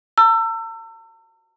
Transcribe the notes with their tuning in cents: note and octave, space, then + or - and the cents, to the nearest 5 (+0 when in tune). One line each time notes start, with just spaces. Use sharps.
A#5 -45 E6 +25